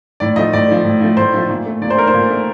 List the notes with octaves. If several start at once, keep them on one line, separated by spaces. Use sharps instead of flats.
A2 D5
F3 A3 D#5
A2 D5
F3 A3
A2
F3 A3
A2 C5
F3 A3
A#2
A3
A#2 D5
C5
A3 A#4
C5
A#2
A3